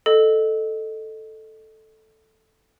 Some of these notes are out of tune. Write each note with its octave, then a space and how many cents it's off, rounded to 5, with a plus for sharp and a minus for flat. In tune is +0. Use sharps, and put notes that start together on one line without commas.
A4 +0 D#5 -15